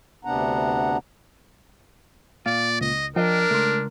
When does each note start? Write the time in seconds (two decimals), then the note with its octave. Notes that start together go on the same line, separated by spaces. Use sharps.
0.25 D2 C3 B3 D4 F#5 A#5
2.46 A#2 D5 F5
2.81 C#2 D#5
3.16 F3 D4 A#4 D#5 G5
3.51 C#2 A3 C6